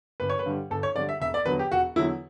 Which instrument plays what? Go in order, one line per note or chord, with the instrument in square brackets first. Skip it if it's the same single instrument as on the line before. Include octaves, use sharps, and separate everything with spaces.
[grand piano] G1 B4
C#5
B4
G2 D3 G3
G1 A4
C#5
G2 D3 G3 D5
E5
E1 E5
D5
E2 D3 F#3 B4
G4
E1 F#4
E2 D3 F#3 E4